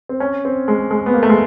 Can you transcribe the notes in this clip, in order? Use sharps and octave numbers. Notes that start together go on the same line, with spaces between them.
C4
C#4
C4
G#3
G#3
B3
A#3
A3
G#3